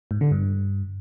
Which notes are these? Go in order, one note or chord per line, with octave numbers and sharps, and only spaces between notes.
G#2
D3
G2